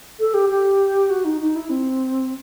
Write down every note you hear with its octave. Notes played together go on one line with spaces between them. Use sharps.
A4
G4
G4
F#4
D#4
D#4
E4
C4